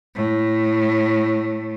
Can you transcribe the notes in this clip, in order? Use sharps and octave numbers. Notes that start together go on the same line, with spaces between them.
A2